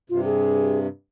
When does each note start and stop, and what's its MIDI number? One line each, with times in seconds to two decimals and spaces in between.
0.10 0.87 43
0.10 0.87 48
0.10 0.20 65
0.25 0.78 68